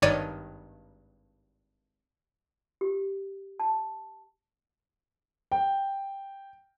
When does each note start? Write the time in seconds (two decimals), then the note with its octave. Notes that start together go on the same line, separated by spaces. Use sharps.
0.02 G#1 G2 D#3 C#5 D5 D#7
2.81 G4
3.59 A5
5.52 G5